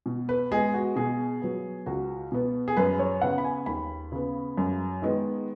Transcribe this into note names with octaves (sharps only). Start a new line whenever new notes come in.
B2
B4
G#3 B3 G#4
F#4
B2 G#4
F#3 B3
C#2 F#4
B2 B3
G#4
F#2 B4
C#5
C#3 B3 F#5
B5
G#5
D#2 B5
C#3 B3
F#2
D#3 G#3 B3